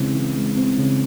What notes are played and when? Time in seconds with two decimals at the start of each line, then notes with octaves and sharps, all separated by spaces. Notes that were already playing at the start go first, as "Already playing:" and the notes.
Already playing: C#3 E3 G#3 C4
0.14 E3
0.35 G#3
0.56 C4
0.78 C#3